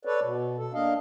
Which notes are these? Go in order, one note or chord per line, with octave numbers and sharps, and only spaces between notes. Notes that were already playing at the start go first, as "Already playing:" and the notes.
A4 B4 C#5 D5
B2
A4
A#3 D4 D#5 F5